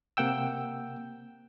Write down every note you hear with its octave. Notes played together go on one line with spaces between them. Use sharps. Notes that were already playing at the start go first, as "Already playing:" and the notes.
C3 A#3 F#5 G5 E6